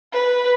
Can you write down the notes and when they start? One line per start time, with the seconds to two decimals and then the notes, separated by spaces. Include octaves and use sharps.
0.12 B4